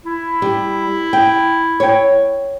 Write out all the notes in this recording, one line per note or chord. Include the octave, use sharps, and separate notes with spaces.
E4
G3
G5
C#5 G5